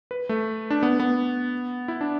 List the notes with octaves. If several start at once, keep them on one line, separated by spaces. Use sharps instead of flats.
B4
A3
D4
B3
B3
E4
D4